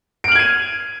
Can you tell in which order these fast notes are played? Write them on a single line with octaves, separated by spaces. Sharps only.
D7 F6 F#7 G#6 D#7